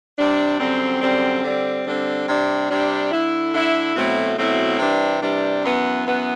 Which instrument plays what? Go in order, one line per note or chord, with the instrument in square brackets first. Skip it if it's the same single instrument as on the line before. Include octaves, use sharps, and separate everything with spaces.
[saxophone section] C3 G3 D4
F#2 D3 G3 C4
F#2 D3 G3 C4
D3 G3 C4
D3 G3 C4
C3 G3 D4
C3 G3 D4
D3 A3 E4
D3 A3 E4
B2 F#3 A3 C4 E4
B2 F#3 A3 C4 E4
C3 E3 G3 D4
C3 E3 G3 D4
F#2 E3 B3
F#2 E3 B3